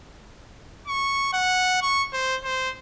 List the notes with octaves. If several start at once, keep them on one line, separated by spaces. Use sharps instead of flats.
C#6
F#5
C#6
C5
C5